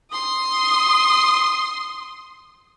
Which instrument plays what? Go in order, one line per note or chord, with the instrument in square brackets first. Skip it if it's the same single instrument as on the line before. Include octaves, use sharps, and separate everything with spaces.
[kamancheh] C6 D#6